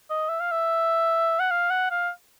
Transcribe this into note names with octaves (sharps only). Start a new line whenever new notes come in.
D#5
E5
F5
E5
F#5
F5
F#5
F5